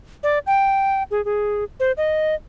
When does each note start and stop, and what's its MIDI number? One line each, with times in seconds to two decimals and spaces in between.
0.23 0.39 74
0.46 1.03 79
1.11 1.23 68
1.25 1.64 68
1.80 1.92 72
1.97 2.35 75